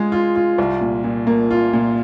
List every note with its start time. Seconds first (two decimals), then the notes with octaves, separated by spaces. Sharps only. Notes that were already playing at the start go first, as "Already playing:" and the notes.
Already playing: G#3 F4 G#4
0.12 F4
0.36 F4
0.58 C2
0.81 A#2
1.04 A#2
1.27 A#3
1.51 F4
1.73 A#2